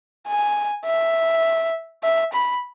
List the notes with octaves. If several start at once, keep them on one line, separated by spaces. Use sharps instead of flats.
G#5
E5
E5
B5